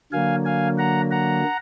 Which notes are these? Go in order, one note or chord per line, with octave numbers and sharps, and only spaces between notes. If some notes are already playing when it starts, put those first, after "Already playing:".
D3 F#3 A#3 F5 G#5
F5 G#5
F#5 A#5
F#5 A#5